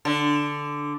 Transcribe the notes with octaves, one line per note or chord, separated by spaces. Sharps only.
D3